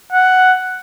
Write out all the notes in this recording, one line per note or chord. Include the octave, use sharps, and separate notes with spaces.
F#5